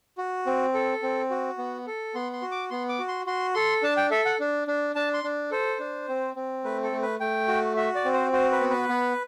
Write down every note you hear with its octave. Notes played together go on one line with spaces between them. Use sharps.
F#4
C4
A4
C4
F#4
B3
A4
B3 C6
C6
F#4
D6
B3 C6
D6
F#4
C6
F#4 C6
A4 C6
D4 A5
G5
A4 E5
F#5
D4
D4
D4 A5
C6
D4
A4 C5
D4
C4
C4
A3 B4
A4
A3
B4
A3 G5
F#4
F#4 E5
D5
C4
C5
F#4 C5
B4
B3
B4
B3